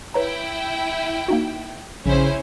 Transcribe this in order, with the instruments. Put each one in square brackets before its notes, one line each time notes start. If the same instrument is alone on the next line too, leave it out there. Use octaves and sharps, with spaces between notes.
[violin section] E4 G5 [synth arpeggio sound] B4 C#5 A#5
[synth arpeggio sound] A#3 D#4 F#4
[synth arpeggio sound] A#1 [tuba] C#3 [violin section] C#4 E4 C5